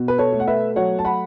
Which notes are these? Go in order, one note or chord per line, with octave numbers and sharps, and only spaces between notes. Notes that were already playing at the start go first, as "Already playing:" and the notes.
Already playing: B2
B4
A4 C#5
A3
F#5
B4 E5
F#3 C#5 F#5
A5
F#5 B5